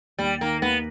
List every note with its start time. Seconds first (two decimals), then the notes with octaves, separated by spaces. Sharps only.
0.19 D#2 G3
0.41 D#3 A#3
0.62 D#2 B3